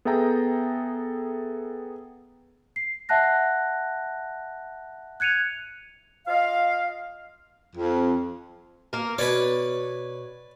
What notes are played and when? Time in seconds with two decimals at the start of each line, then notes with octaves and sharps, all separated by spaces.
0.05 B3 G#4 A4 E5 G5 A#5
2.76 C7
3.09 E5 F#5 A5 F#6 A#6
5.20 F#6 G#6 C#7 D#7 F7
6.28 F4 D#5 F5
7.75 F2
8.93 A#3 A#4
9.18 B2 B4 C#5 D5